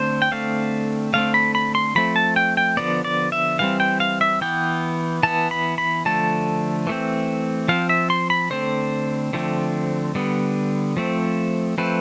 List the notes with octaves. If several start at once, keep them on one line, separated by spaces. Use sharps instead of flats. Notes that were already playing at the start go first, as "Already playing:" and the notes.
Already playing: D3 A3 C4 C5
G5
D3 A3 C4 F5
D3 A3 C4 F5
B5
B5
C6
F3 A3 C4 B5
A5
G5
G5
D3 F3 B3 D5
D5
E5
E3 G3 C4 F5
G5
F5
E5
E3 B3 G5
E3 B3 A5
B5
B5
D3 F3 A3 A5
E3 A3 C4
F3 C4 F5
E5
C6
B5
D3 A3 C4 C5
D3 F3 A3 C4
D3 G3 B3
F3 A3 C4
F3 A3 C4 B4